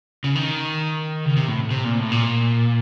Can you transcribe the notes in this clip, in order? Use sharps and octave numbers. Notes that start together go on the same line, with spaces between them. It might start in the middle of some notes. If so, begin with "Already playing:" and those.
C#3
D#3
C#3
C3
A2
C3
A#2
A2
A#2